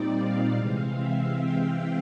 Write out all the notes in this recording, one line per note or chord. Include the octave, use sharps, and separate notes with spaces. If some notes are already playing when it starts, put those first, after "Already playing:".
Already playing: A#2 G3 C4 D#4 D5
F5
C3 E3 G#3 C4 F5
E5
G5